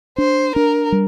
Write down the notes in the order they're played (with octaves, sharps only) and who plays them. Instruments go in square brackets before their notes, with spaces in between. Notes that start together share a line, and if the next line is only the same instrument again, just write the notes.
[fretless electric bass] D4 [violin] C5
[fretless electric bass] D4 [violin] A#4
[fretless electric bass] G3